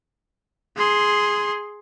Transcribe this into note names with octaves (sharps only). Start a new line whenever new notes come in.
G#4 C6